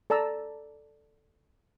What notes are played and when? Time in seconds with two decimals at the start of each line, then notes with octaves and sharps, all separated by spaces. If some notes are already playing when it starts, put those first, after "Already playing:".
0.10 A4 D5 A5 A#5 E6